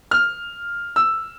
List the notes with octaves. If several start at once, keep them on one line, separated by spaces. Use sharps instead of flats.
F6
E6